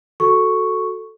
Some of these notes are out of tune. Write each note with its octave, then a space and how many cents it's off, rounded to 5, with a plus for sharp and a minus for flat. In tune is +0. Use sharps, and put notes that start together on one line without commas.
F#4 +0 A4 +0 C#6 +0